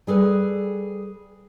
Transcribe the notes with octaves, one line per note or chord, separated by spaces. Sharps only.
G3 G#4 A4 B4